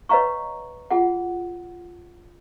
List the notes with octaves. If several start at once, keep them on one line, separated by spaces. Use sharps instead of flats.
B4 C#5 D#5 F5 A#5 C#6
F4 G#4 F#5